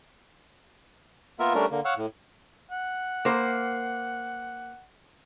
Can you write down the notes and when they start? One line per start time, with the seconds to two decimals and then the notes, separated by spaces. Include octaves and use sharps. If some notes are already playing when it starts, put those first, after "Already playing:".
1.39 A#3 B3 F4 A#4 E5
1.55 G3 A3 C#4 D4 A#4
1.71 D3 A#3
1.85 C#5 F5 F#5 E6
1.97 A2
2.71 F#5
3.25 A#3 C5